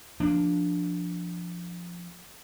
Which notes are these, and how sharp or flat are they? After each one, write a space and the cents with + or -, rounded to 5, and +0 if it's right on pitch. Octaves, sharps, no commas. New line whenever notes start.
F3 +0 A#3 +0 D4 +0